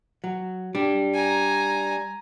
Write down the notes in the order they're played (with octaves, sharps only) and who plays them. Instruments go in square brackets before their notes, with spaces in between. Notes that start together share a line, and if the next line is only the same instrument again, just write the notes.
[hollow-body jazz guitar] F#3
G3 D4
[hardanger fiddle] G#5 A#5